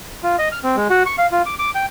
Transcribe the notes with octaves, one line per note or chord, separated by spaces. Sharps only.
F4
D#5
F6
C4
G#3
F#4
C#6
F5
F4
D6
D6
G5